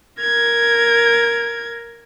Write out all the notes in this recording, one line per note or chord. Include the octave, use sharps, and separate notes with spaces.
A#4 G#6